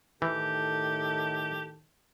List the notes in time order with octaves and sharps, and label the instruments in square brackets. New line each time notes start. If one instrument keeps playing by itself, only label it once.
[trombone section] A2 D#3 A4 [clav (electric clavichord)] E3 [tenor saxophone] G4